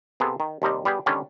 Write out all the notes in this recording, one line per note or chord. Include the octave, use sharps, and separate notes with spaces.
C3 B3 G#4 A4
D#3
D#2 C3 G3 D#5
G3 B3 G4 G#4
D3 D#3 G3 C#4 D4